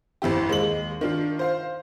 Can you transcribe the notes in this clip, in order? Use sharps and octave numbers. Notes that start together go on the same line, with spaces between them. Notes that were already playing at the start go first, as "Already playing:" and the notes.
A1 F2 E4 G4
D#2 G#3 F#7
D#3 D4 F4
C5 F5